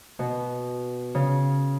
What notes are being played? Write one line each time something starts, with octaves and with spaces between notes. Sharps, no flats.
B2
C#3